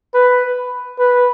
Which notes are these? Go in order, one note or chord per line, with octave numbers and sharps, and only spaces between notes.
B4
B4